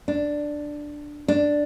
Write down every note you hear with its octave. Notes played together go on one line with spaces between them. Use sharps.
D4
D4